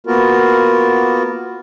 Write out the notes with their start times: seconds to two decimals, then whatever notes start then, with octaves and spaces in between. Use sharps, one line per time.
0.07 A#3 B3 F4 F#4 A#4